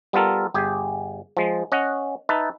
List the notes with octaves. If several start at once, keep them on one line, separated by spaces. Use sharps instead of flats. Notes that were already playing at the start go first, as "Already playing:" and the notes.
G3 B3 F4 A4 A#4
G1 G4 G#4 G#5
F3 G#3
C#4 D#5 F#5
D#4 B4 E5 A5